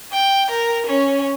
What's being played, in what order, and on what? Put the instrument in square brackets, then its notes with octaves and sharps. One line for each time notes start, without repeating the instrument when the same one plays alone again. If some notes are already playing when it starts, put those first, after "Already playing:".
[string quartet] G5
A#4
C#4